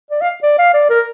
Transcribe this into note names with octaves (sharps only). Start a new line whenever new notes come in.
D5
F5
D5
F5
D5
A#4